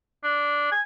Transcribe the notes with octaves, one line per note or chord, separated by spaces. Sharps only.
D4
G#5